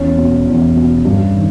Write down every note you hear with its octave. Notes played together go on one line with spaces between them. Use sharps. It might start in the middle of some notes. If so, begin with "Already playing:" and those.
Already playing: E2 C#4
B2
E2
B2
G2
D#3